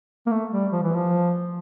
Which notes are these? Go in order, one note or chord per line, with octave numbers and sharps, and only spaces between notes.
A#3
A3
G3
F3
E3
F3